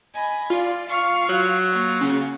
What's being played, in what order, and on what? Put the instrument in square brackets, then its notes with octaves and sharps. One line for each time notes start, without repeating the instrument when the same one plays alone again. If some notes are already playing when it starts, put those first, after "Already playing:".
[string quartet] D#5 G#5 B5
[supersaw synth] F4 [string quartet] D5
[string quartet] F5 C#6 F6
[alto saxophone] F#3
[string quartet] A#3 F4 F#4
[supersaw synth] C#3